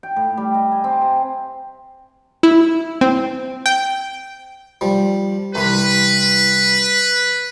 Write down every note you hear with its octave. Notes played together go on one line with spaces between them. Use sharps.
G5
A2
G3
D#5
G#5
C4
C3
E4
C4
G5
F3 G3
C2 E3 B4 C6